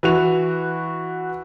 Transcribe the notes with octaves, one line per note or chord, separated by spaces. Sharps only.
E3 F#4 F7